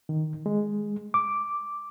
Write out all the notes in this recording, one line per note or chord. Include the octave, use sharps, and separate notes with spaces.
D#3
G#3
D6